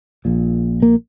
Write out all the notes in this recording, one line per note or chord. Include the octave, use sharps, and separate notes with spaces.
A#1 A#2
A#3